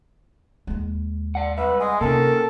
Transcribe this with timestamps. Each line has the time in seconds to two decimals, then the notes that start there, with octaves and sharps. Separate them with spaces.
0.67 D#2 G#3
1.35 D5 F#5
1.58 C2 B4 E5 F#5
1.80 G#3 G#5
2.01 C3 A#3 C#4 A4 A#4